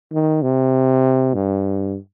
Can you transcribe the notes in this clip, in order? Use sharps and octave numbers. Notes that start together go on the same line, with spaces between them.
D#3
C3
G2